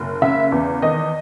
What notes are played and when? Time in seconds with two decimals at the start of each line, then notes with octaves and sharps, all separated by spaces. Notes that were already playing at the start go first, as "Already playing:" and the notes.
Already playing: F#1
0.22 C#3 E5
0.52 E2
0.82 D#3 D#5